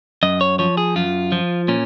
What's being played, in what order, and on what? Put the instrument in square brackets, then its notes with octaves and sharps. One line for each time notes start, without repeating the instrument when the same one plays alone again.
[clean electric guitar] F#2 D#5
C#5
F3 C#5
G#4
F#2 F4
F3
A#2 C#4